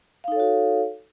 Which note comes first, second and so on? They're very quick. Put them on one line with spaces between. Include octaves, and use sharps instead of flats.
F5 D#4 A4 C#5 F#4